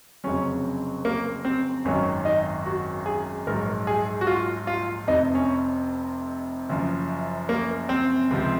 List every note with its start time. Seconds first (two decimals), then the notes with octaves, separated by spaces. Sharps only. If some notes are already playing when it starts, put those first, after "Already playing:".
0.24 F1 F2 C#3 F#3 C#4
1.05 A#3
1.45 C4
1.85 G#1 F#2 D#3 F#3 C#4
2.25 D#4
2.66 F#4
3.06 G#4
3.46 A#1 G#2 F#3 A#4
3.87 G#4
4.21 F#4
4.27 F4
4.67 F4
5.07 F1 F2 C3 D#4
5.35 C#4
6.69 F#1 F#2 F3
7.49 A#3
7.89 C4
8.30 C#2 C3 F3